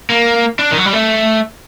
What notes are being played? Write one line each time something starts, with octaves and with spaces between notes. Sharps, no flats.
A#3
D4
D#3
F#3
G3
A3